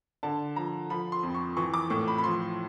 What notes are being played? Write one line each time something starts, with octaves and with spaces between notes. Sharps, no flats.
D3 A5
F3 A#5
F3 B5
C6
F2
C#6
E3 C#6
D6
A2 C#6
B5
B5
F3 C6